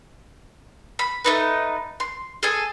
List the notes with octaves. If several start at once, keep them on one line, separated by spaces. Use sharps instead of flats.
B5
A3 D#4 B4
C6
G#4 A4 G#5